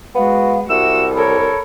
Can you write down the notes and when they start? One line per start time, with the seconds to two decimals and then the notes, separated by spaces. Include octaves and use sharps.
0.15 G#3 B3 F#4 F5
0.70 C2 F#4 E5 E6
1.15 A4 A#4 C#5 B5